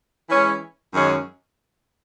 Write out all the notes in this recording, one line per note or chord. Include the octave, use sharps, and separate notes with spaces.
E3 G#3 C#4
F#2 D#3 G#3 C#4